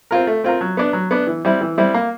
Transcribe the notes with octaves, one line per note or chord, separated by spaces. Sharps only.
C4 F4 A#4
A3
C4 F4 A#4
F#3
B3 D4
F#3
B3 D4
E3
G3 C4 E4
E3
G3 C4 E4
A#3